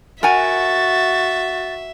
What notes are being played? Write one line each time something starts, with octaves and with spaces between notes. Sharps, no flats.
F#4 A#4 E5 F#5 G#5 A6